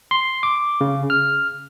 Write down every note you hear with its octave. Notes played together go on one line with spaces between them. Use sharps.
C6
D6
C#3
F6